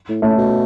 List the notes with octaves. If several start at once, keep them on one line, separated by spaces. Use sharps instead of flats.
A2
A2 A3 C#4
B2